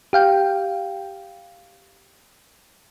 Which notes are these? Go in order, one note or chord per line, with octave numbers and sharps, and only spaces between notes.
G4 F5 G5